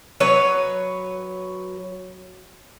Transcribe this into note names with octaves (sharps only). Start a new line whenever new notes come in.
F#3 B4 C#5